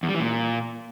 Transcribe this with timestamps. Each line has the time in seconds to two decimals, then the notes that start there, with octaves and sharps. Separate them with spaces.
0.03 E2
0.09 G3
0.14 E3
0.20 A#2